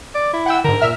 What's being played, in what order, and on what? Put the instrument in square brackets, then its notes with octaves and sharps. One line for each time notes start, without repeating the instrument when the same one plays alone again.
[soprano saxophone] D5
E4
[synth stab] F#5 G5 E6
[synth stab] G#2 D3 [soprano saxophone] A#4
[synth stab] A#2 E5 F6